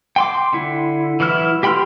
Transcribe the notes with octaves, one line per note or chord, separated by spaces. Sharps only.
G5 C6 D6
D3 E4
E3 F#3 E4 F6
G4 G5 B5 C6 F6